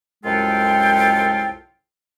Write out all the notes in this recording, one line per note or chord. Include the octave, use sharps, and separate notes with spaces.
C2 F#2 G#3 F4 A4 G5